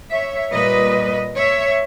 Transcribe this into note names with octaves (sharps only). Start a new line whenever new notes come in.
C#5 E5
A#2 G3 B4 D#5
C#5 E5